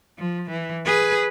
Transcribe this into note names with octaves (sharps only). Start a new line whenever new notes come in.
F3
E3
G#4 B4